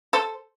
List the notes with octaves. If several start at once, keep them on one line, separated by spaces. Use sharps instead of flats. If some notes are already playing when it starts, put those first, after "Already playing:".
A4 C5